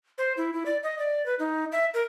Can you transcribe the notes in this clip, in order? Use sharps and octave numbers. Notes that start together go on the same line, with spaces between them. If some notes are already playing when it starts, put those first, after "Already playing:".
C5
E4
E4
D5
D#5
D5
B4
D#4
E5
A#4